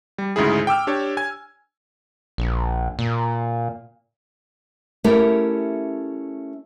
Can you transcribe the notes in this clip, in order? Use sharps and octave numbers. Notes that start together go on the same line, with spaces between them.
G3
D2 G#2 C#3 E4 G#4
G5 D6 E6 F6
D4 G4 C#5
G#5 G#6
A#1
A#2
A3 C#4 E4 G4 A#4